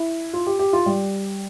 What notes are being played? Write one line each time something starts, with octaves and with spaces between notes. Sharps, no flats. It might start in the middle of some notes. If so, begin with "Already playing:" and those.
Already playing: E4
F4
G4
G4
F4
G3